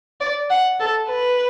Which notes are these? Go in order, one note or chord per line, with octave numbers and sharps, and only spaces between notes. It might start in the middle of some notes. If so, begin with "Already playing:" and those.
D5
F#5
A4
B4